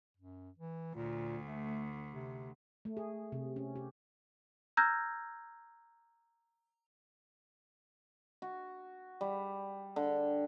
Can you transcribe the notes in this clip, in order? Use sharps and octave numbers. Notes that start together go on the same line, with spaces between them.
F#2
E3
D2 A#2
A3
C3
A3
G#4
C3
C#4
G4
A#5 E6 F6 G6 G#6 A#6
F#4
G3
D3